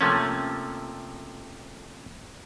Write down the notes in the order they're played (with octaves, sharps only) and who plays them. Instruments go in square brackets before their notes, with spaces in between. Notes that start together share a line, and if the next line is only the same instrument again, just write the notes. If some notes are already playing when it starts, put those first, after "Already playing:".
[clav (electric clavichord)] C3 F3 A3 A#3 C#4